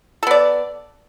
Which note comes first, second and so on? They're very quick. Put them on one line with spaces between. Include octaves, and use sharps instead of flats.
A4 B3 D5